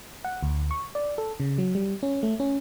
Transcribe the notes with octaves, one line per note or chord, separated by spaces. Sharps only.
F#5
D2
C#6
D5
A4
C#3
F#3
G3
C#4
A3
C#4